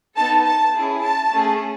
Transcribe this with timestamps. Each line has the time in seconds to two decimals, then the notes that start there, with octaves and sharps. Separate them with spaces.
0.16 B3 D#4 A4 A5
0.45 A5
0.74 C#4 E4 G#4
1.04 A5
1.33 A3 C#4 G#4